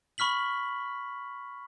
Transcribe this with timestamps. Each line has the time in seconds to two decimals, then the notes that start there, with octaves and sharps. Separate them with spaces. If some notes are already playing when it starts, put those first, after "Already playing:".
0.18 B5 C#6 F6 B6 F#7